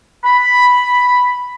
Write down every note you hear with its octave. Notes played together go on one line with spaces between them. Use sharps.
B5